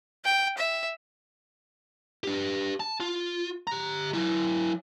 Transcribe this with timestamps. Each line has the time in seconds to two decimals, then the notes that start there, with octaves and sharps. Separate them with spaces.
0.24 G5
0.57 E5
2.24 D4 G4
2.80 A5
3.00 F4
3.67 G4 A#5
4.14 F#3 E4